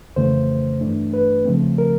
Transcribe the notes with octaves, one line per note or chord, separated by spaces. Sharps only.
F2 C#3 E3 A3 C5
G2 E3 A3 D4
B4
C#3 F3 A3 C4
A#4